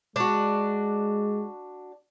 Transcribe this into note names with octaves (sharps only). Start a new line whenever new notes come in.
G#3 D4 F#4